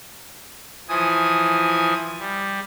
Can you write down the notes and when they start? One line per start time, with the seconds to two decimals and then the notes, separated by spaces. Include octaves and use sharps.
0.88 E3 F3 G#5 D#6
2.19 G3